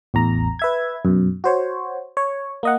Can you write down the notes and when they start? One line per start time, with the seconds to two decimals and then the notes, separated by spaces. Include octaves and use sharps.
0.14 A1 E2 A#5
0.59 B4 E5 G#6
1.05 F#2 B2
1.44 F#4 C5 C#5
2.17 C#5
2.63 A#3 D#5 F#5